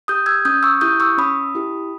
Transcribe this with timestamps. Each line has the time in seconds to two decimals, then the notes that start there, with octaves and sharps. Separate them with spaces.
0.08 G4 D#6 G6
0.26 E6 G#6
0.45 C#4 D#6 G6
0.63 C#6 E6
0.81 E4 G4 D#6 G6
1.00 C#6 E6
1.18 C#4 B5 D#6
1.55 E4 G4